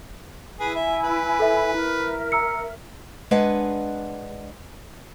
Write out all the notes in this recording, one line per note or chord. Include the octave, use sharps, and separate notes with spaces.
E4 G#4 B4 G#5
E5
B4
A4 E5
E4 A#4 E5
A#5 E6 C#7
G#3 D4 B4 F#5 G#5